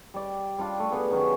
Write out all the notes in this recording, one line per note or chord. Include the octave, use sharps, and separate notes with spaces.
G3 D5
G3 D4 F4
A3
B3 G#4 B4 F#5
D#3 F#3 C#4